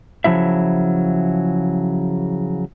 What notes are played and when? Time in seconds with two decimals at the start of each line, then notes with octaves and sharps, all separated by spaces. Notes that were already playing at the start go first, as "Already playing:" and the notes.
0.24 C#3 F3 F#3 E4 E5